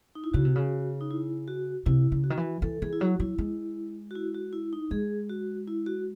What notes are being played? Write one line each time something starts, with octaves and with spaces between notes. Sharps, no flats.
D#4
E4
C#3 F#4
C3
C#3
D#4
E4
F#4
C3 E4
C#3
F#4
D#3
E3
E3 A4
E3 G#4
E4
F#3 F#4
F#3 E4
G#3
F#4
E4
F#4
E4
D#4
G#3 G#4
F#4
E4
F#4